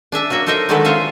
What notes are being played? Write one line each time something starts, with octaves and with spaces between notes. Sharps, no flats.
D4 G#4 E5 A5
F#3 A#3 F#4 E5
D#4 A4 A#4 C5 D#5 E5
D3 D#3 F#3 G#3 A4 B4
F4 G#4 C5 C#5 E5 F5